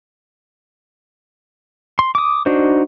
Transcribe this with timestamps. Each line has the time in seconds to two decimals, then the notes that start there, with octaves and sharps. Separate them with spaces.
1.99 C6
2.15 D6 D#6
2.46 D4 D#4 F#4 C5